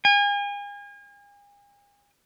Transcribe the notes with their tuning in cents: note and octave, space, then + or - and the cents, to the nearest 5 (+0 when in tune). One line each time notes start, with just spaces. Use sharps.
G#5 -40